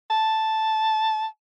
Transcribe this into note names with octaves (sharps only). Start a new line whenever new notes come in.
A5